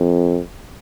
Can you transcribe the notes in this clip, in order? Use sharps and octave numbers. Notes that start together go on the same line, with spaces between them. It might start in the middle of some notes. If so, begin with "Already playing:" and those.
Already playing: F2